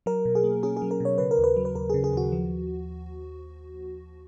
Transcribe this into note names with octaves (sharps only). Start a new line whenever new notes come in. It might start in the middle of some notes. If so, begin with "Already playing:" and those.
F#3 A#4
B2
G#4
A#3
C#4 G#4
G#4
F#3
A#4
B2 C#5
C#3 B4
A#4
D#2
B4
F#3
B4
D#2 A#4
C#3 G#4
G#4
D#2 F#4
F3